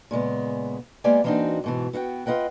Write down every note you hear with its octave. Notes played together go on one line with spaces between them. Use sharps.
A#2 C#3 G#3 B3
G#3 A#3 B3 G4 D5 G#5
E3 A#3 C4 D4 D#4 F#4
G#2 B2 E3
B3 F#4 F5 G5
F4 B4 D#5 F#5 G5